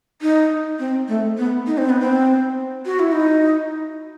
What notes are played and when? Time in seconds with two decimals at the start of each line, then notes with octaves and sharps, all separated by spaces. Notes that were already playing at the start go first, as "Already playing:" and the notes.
0.22 D#4
0.79 C4
1.08 A3
1.38 B3
1.67 D#4
1.78 C4
1.90 B3
2.01 C4
2.86 F#4
2.99 E4
3.12 D#4